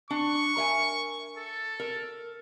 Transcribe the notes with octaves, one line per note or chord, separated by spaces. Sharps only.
D4 C#6
A#4 E5 G#5
A4
A#4